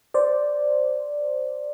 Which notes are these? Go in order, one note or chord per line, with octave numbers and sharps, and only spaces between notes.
C5 D5